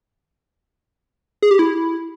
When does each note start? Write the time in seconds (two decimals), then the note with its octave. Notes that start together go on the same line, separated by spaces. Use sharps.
1.42 G#4
1.51 G4
1.59 E4